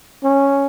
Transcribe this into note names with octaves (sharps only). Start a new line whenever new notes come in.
C#4